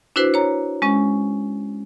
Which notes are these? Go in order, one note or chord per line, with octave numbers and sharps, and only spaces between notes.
D4 E4 F#4 B4 C5
C#5 A#5
G#3 C#4